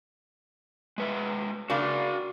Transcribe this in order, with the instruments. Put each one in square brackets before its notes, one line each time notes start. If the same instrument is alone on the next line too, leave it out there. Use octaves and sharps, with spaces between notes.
[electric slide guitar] G#3 B4 E5
[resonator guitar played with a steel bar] C#3 A#3 D4 [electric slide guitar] F#4 F5